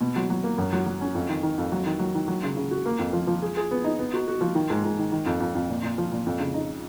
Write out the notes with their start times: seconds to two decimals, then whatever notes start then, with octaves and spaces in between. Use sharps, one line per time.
0.01 B2
0.16 F#3
0.30 F#3
0.43 A#3
0.58 F#2
0.73 F#3
0.86 F#3
1.01 C#4
1.15 F2
1.29 D#3
1.43 D#3
1.58 F2
1.72 F#3
1.86 D#3
1.99 F#3
2.15 D#3
2.28 F#3
2.43 C#3
2.57 C#3
2.71 F#4
2.86 A#3
2.99 F2
3.13 F3
3.27 F3
3.42 G#4
3.57 G#4
3.71 B3
3.84 D#4
3.99 B3
4.14 F#4
4.28 F#4
4.41 F3
4.55 D#3
4.70 G#2
4.84 G#2
4.99 D#3
5.12 D#3
5.26 F2
5.40 F2
5.55 F2
5.69 A#2
5.83 A#2
5.98 F3
6.12 A#2
6.26 F2
6.40 C#3
6.54 D#4